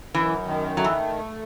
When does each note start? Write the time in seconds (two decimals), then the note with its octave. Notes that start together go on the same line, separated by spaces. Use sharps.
0.15 F#2 E3
0.46 D#3
0.77 F#3 A3
0.84 E3